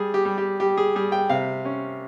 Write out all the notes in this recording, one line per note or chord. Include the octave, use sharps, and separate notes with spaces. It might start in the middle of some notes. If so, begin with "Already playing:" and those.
Already playing: G3 G#4
G4
G3
G4
G3 G4
G#4
G3 G#4
G5
C3 F5
C#4